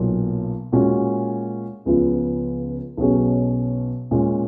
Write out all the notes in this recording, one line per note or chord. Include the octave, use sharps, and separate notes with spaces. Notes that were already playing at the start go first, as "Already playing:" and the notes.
Already playing: B1 A#2 F#3
A#2 G#3 C#4 F#4
C#2 C#3 F3 B3 F4
B1 B2 F#3 C#4 G#4
A#2 G#3 C#4